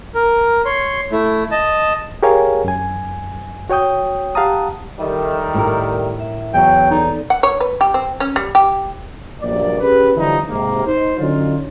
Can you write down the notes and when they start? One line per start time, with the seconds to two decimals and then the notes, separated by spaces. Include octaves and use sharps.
0.15 A#4
0.65 C#5 C6
1.12 A3 E4
1.51 D#5 A5
2.23 G4 G#4 A#4 C#5 F5 G#5
2.65 F#2 G#5
3.70 F#4 C#5 G5 D#6 G6
4.35 G4 F5 F#5 A5 A#5 D#6
4.99 D#3 G3 A4 D#5 E5
5.54 A2 A#4
6.20 E5
6.54 E2 F#3 G5
6.91 D#4 A4 D5
7.30 F#5
7.43 C#5
7.60 B4
7.81 G4
7.94 C4
8.20 C#4
8.36 G3
8.55 G4
9.41 A#1 G2 F#3 A#3 D5
9.80 C#4 G4 G#4 B4
10.15 D3 E3 F3 G3 B3 D#4
10.48 G#2 C3 A#3
10.85 D#4 C5
11.18 D3 F#3 C#4 D#4 F4